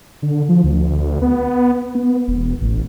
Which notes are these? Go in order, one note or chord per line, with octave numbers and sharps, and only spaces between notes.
D3
F3
D2
B3
B3
E1
A1